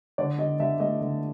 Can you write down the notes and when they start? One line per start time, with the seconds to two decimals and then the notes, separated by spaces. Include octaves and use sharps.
0.18 D3 D5
0.38 D3 D#5
0.60 D3 E5
0.80 A3 D#5
1.01 D3